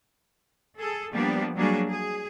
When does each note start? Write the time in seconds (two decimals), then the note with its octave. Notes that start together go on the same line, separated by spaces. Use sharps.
0.77 G#4 A4
1.13 F3 G3 A#3 B3 D4
1.56 F#3 G3 A#3 D4 G#4
1.88 G#4